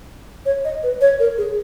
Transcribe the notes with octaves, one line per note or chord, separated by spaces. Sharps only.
C#5
D#5
B4
C#5
A#4
G#4